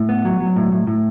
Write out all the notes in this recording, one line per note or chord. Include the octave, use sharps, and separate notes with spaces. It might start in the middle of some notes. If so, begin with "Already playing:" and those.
Already playing: A2
B3
F#3
F#3
A2
A2
A2